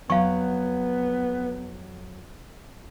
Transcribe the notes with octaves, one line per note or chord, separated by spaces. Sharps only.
F2 F#3 B3 F5 C#6